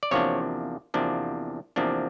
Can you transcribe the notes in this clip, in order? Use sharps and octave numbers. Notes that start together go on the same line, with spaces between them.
D5
E2 C3 F3 A#3 D4 C#5
E2 C3 F3 A#3 D4
E2 C3 F3 A#3 D4